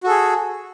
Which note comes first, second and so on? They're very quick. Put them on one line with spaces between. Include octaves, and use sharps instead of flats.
F#4 A4 G#4